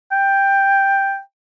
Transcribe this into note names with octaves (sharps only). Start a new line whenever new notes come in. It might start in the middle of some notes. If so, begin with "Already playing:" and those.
G5